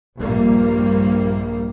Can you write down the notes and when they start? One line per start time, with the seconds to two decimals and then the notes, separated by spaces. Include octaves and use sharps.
0.19 A#1 G2 G3 A#3